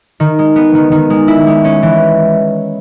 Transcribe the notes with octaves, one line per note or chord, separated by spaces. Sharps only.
D#3
G#3
B3
D#3
D#3
G#3
E4
G#3
C#4
E3